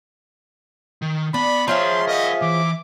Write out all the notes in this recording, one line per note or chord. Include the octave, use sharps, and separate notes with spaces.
D#3
B3 D4 B5
F3 C#4 G#4 C#5 E5 A#5 C6
A#4 D#5 F#5
E3 D6